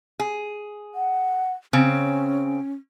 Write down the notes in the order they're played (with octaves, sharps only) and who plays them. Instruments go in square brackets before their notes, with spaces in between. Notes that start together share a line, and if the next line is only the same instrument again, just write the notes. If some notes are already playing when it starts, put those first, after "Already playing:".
[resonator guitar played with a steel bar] G#4
[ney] F#5
[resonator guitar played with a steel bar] C#3 C4 [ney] C#4